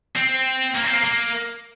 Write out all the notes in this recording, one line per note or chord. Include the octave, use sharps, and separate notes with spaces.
C4
A#3
C4
A#3
A#3